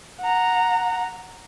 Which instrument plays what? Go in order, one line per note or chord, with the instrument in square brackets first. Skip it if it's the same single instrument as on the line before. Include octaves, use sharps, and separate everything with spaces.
[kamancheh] F#5 A#5